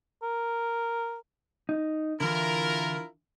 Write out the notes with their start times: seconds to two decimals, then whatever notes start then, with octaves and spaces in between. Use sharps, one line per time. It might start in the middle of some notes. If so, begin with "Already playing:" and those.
0.23 A#4
1.69 D#4
2.20 D3 E3 E4 F4 A#4